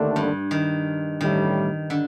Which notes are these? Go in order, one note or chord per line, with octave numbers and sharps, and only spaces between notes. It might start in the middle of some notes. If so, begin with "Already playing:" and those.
Already playing: D#2 D3 A3 D4
G2
D#3
A1 A2 D#3 G3
D3